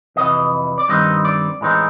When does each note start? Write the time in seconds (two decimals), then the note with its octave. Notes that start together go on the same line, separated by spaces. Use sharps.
0.16 F2 C3 E3 D#5
0.78 D5
0.88 G2 D#3 G3 C4 D#4 D#5
1.25 D5
1.61 A2 E3 G#3 C4 D#4